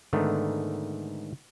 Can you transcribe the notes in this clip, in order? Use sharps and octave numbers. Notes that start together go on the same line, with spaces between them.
G#2 D3 D#3 A3 B3